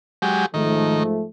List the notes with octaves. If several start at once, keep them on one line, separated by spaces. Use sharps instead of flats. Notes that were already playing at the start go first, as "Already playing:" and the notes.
F#3 G#3 G4
G#2 D#3 F3 A3